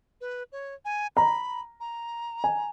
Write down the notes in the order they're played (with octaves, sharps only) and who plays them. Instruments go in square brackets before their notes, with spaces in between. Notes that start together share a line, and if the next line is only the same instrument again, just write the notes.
[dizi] B4
C#5
G#5
[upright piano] A#5 [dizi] B5
[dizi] A#5
[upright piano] G#5